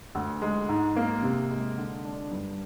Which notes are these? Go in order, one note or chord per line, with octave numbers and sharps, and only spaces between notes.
D2
G#3
G#2
A#3
C3
G#3
D3
D4
G2